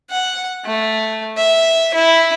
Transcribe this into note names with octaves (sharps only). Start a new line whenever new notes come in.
F#5
A3
E5
E4